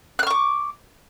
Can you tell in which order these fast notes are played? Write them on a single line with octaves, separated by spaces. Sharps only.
F#6 F6 C#6 D6